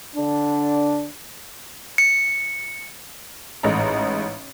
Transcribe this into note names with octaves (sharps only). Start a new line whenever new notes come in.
D3 D4
C#7
A1 G#2 D#4 A#5